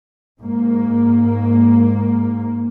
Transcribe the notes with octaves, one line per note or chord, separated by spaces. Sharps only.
G#2 A#3